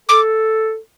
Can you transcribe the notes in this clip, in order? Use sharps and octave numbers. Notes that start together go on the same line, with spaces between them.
A4 D6